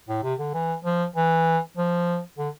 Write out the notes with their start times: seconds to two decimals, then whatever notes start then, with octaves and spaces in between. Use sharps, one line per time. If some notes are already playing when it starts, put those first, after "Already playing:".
0.09 A2
0.23 C3
0.40 D3
0.54 E3
0.85 F3
1.16 E3
1.77 F3
2.38 D3